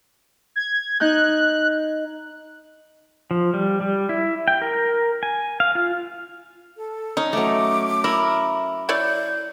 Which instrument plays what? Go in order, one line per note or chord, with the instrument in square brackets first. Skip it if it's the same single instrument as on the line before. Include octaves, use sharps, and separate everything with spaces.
[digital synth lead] G#6
[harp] D#4 G6 [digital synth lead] F#6
[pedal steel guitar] F3
G3
G3
E4
G5
A#4
G#5
F5
F4
[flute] A4
[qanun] C#4 [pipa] D#4
[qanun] F#3 A3 [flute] D6
[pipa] E4 [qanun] A#4
[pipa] E4 C#5 D5 [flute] G6